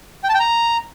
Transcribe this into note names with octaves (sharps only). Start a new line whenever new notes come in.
G5
A5
G5
A#5